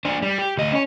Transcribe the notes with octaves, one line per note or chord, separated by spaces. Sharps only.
D4 C5
G3
G4
D2 D#5
C#4 C#5